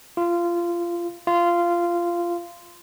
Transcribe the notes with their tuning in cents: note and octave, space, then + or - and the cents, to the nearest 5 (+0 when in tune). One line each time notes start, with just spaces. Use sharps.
F4 -20
F4 -15